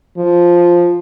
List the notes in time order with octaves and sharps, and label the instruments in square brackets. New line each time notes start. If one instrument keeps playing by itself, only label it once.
[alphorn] F3